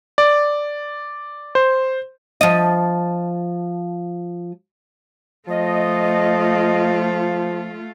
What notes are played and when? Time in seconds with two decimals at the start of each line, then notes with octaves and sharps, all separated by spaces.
0.18 D5
1.55 C5
2.41 F3 D#5
5.49 F3 A3 F4 D#5